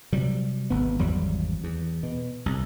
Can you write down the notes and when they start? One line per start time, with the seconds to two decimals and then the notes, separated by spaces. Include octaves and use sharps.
0.12 C3 F#3 G3
0.70 G#1 B3
0.99 G#1 E2 F#3 G3
1.64 E2
2.03 B2
2.46 C2